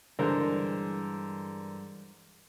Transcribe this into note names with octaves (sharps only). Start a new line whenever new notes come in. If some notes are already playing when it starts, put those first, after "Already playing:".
G2 D3 E3 G#3 A#4 C5